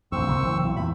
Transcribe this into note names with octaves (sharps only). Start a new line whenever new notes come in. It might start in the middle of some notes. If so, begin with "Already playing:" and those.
A1 D2 C4 C#6 E6
A#1 C3 A#3
F#1 E3
B1 E3
E2 A#2 E3 B5